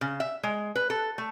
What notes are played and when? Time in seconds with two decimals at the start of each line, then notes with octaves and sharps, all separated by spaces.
0.01 C#3
0.20 E5
0.43 G#3
0.76 B4
0.90 A4
1.18 A3